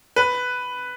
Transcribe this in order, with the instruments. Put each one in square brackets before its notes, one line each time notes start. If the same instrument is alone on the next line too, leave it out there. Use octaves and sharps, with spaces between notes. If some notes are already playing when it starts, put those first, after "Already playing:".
[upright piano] B4